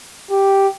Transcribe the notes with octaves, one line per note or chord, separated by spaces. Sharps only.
G4